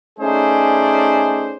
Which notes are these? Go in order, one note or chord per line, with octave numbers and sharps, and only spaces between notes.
A3 C#4 D#4 G#4 C5 D5